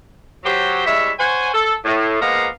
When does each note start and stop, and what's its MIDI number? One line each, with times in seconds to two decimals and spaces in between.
0.45 0.84 54
0.45 0.84 67
0.45 0.84 72
0.86 1.12 55
0.86 1.12 56
0.86 1.12 64
0.86 1.12 73
0.86 1.12 76
1.19 1.51 72
1.19 1.51 73
1.19 1.51 78
1.19 1.51 80
1.54 1.74 69
1.85 2.19 45
2.21 2.47 53
2.21 2.47 56
2.21 2.47 58
2.21 2.47 59
2.21 2.47 77
2.21 2.47 82